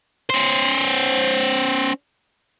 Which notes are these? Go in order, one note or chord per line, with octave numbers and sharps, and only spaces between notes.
C#4 C5